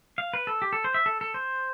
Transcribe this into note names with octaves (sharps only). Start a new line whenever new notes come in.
F5
B4
A4
G4
A4
C5
E5
A4
A4
C5